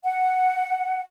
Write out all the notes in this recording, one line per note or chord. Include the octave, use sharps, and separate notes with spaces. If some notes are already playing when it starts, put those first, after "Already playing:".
F#5